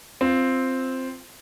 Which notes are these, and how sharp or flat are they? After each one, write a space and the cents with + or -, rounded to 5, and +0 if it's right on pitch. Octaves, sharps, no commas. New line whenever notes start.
C4 +0 F4 -5